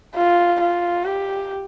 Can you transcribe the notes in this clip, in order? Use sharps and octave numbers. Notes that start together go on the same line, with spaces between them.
F4
F4
G4